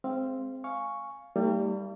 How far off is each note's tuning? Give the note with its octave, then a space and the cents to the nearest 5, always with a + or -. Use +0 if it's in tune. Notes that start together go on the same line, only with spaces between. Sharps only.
G#3 +20 C4 +0 F5 -25
F5 +0 G#5 +0 C#6 +0
G3 +0 A#3 -45 D#4 +40